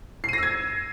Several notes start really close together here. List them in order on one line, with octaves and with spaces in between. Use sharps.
C7 D#7 A#6 E6 G#6